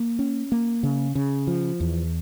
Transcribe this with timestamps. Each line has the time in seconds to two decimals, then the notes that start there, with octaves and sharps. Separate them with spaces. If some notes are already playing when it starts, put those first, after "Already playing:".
Already playing: A#3
0.19 C#4
0.52 A#3
0.83 C#3
1.15 C#3
1.47 F3
1.80 E2